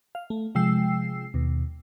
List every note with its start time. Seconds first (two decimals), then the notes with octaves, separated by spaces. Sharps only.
0.15 F5
0.30 A3
0.55 C3 F3 G#3 G5 E6 C7
1.34 D#2 B2